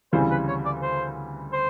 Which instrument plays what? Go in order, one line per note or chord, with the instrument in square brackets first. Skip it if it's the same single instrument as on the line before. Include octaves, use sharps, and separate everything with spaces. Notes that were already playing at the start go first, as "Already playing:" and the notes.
[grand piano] D2 C#3 E3 G3 C4 [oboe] C5
[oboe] B4
C#5
D5
C5
C5